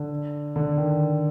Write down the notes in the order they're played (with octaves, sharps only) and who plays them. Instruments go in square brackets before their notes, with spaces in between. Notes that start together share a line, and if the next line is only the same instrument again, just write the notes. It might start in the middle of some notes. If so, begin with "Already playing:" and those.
Already playing: [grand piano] D3
D3
D#3